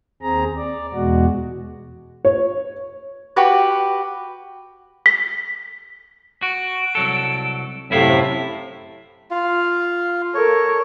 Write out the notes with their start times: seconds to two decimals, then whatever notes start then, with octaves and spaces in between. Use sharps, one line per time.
0.22 D#2 C4 G#4 A#5
0.57 D5
0.93 E2 B2 G#3 F#4
2.25 C#5
3.36 F#4 G4 B4
5.06 B6
6.42 F#4 D7
6.95 C2 F#3 A4
7.91 F#2 A2 C3 E4 F5 B6
9.31 F4 F5
10.34 A4 A#4 C#5